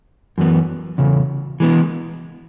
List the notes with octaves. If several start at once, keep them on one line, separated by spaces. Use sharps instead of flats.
F#2 E3 B3
E2 C#3
E3 G#3 B3